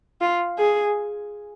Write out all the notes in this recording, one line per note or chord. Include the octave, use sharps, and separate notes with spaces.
F4
G#4